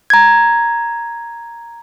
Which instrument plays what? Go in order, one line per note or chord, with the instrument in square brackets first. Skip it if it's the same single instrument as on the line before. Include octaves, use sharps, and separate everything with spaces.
[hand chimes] A#5 G#6